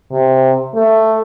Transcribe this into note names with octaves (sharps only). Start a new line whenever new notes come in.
C3
A3